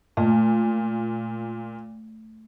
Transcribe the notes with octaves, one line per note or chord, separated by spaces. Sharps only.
A#2 A3